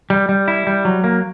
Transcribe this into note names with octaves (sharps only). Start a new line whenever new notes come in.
G3
G3
E4
G3
F#3
A#3